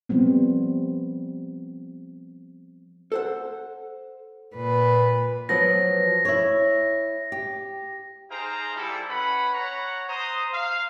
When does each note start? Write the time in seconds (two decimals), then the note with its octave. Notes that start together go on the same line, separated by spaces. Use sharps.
0.09 F3 G3 B3 C4
3.12 A4 C5 F#5
4.55 A#2 B4
5.49 F3 F#3 B3 A#6
6.25 E4 C#5
7.32 G4
8.31 D#4 G#4 C5 F5 G5 A#5
8.76 G3 E4 A4
9.09 C#4 B4 F#5 B5
9.53 C#5 F#5 A#5
10.08 C5 A#5 D#6
10.53 F5